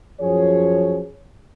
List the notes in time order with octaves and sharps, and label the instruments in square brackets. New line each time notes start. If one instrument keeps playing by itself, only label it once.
[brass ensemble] F#2 F3 G#4 C#5